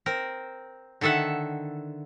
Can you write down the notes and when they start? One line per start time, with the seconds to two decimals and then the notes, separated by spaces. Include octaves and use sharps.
0.06 C4 A#4
1.01 D3 D#3 A4 E5 F#5